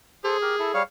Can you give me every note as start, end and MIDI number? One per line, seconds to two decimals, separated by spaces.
0.24 0.80 68
0.24 0.37 69
0.24 0.37 72
0.42 0.56 67
0.42 0.56 70
0.59 0.72 64
0.59 0.72 69
0.74 0.83 55
0.74 0.83 73
0.74 0.83 77